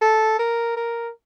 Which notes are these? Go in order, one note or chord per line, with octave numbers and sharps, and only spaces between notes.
A4
A#4
A#4